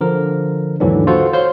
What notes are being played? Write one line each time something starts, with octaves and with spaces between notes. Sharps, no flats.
D3 F3 A#4
D#2 G#2 D3 E3 F#3 D4
F4 F#4 A4 C5 F#5
C5 C#5 F5 C6